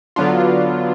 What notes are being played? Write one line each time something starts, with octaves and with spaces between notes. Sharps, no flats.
D3 F#3 B3 D4 F4